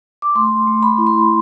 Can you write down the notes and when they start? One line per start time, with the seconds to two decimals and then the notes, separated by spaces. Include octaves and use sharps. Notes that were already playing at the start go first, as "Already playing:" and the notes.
0.22 D6
0.35 A3 C6
0.67 A3
0.83 B5
0.98 E4
1.07 C6